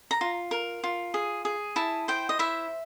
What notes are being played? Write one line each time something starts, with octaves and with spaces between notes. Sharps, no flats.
A#5
F4
A#4
F4
G#4
G#4
E4 A5
C5 G5
D#5
E4 E5